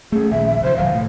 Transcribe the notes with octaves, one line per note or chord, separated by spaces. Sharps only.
A3 C#4 G#4
A#1 D#2 E5
E5
C#3 F3 C5
E1 D#3 F#3 F5
A2